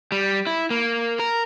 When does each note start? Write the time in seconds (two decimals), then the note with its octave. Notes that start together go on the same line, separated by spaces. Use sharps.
0.12 G3
0.47 E4
0.70 A#3
1.19 A#4